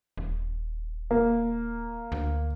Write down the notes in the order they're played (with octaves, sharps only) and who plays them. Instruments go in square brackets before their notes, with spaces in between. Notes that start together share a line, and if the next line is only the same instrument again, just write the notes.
[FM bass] D#1
[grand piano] A#3
[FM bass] D2